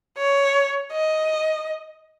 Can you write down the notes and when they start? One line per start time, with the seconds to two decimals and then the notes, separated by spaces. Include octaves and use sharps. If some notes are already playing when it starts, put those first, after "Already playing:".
0.18 C#5
0.92 D#5